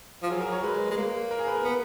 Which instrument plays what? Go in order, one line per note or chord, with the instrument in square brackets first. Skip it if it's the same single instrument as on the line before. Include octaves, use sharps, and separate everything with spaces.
[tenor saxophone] F3
[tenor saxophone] F#3 [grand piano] G#4
[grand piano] A#4
C#5
[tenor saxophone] G#3 [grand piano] B4
[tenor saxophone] G#3
A#3
[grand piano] A#4
G#4
B4
A#4
[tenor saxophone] B3 [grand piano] B4